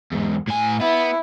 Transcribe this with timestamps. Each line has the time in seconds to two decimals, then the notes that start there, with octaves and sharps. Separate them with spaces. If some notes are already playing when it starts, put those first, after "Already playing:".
0.12 E2 G#2
0.48 A2 G#5
0.81 B3 E4